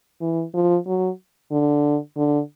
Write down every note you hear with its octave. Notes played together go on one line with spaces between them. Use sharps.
E3
F3
F#3
D3
D3